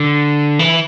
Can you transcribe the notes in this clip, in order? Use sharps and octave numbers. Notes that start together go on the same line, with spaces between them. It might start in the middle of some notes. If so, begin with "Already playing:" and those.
Already playing: D3
E3